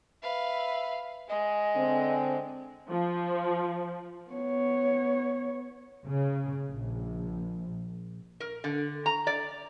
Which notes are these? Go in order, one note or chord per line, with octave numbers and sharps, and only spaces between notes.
B4 E5 F5
G#3 D#5 G#5
D3 C4
F3
B3 C#5
C#3
A#1
A#4
D3
A#5
D5